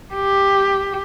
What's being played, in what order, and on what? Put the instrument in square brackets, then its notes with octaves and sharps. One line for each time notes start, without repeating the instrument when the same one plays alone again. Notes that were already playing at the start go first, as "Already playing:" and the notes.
[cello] G4